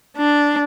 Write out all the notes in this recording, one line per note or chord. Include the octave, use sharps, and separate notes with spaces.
D4